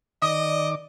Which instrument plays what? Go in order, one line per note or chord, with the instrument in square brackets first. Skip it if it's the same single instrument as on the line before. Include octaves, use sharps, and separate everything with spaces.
[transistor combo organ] D#3 D6 [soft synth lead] D5 [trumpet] D#5 [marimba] D#6